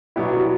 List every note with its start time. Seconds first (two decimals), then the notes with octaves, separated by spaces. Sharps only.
0.16 B2 F#3 B3 D4 E4 G4
0.33 F#4